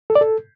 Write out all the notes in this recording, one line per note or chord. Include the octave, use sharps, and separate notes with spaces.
A4
D5
A4